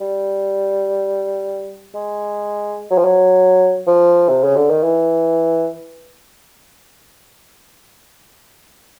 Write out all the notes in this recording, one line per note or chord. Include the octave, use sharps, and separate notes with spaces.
G3
G#3
F#3
F3
F#3
F3
C3
C#3
D3
D#3
E3